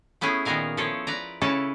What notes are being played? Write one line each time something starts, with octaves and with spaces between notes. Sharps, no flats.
A3 B3 C#4 E4 G#4
A#2 D#3 B3 G#4 A#4 F5
F3 E4 G#4 A4 C#5
B4 D5 A#5
C#3 C#4 E4 F#4 A4 A5